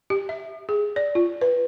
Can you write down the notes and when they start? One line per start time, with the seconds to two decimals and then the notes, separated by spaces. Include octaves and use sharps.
0.10 G4
0.29 E5
0.69 G#4
0.96 D5
1.15 F4
1.41 B4